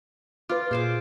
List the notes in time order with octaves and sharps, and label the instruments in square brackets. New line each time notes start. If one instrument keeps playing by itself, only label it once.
[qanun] F4 [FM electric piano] B4 D6
[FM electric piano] A#2 [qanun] G#4 C5 D6